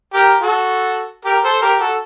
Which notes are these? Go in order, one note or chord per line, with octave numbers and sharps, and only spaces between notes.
G4 A#4
F#4 A4
G4 A#4
A4 C5
G4 A#4
F#4 A4